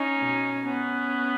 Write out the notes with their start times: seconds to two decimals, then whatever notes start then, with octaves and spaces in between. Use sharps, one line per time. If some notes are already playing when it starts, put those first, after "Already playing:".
Already playing: C#4 D#4
0.17 B2
0.66 B3 C#4